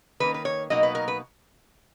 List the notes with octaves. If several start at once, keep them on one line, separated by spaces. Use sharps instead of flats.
D#3 A#3 C#4 B4
B4
C#5
B2 F#3 A#3 D#4 D#5
B4
A#4
B4